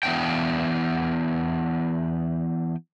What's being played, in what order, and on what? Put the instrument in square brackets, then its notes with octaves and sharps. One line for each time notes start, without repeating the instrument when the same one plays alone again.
[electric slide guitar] E3 B3 C#4 D4 G5